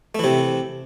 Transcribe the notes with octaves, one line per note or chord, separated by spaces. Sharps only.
C3 E3 A3